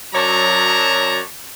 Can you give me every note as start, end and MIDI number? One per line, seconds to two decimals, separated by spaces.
0.14 1.20 42
0.14 1.20 54
0.14 1.20 73
0.14 1.20 74
0.14 1.20 81
0.14 1.20 82